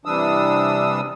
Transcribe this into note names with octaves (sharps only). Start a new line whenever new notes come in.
C3 E3 G3 D4 D#6 E6